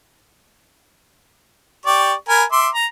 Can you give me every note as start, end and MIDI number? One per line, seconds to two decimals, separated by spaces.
1.86 2.13 67
1.86 2.13 74
1.86 2.13 85
2.29 2.44 70
2.29 2.44 80
2.29 2.44 83
2.52 2.69 76
2.52 2.69 84
2.52 2.69 86
2.74 2.86 82